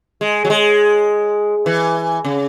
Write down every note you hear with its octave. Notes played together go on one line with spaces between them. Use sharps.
G#3
F#3
G#3
E3
C#3